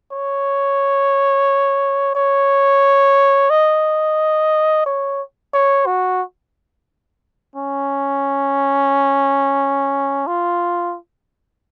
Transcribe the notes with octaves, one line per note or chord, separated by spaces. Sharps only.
C#5
C#5
D#5
C#5
C#5
F#4
C#4
F4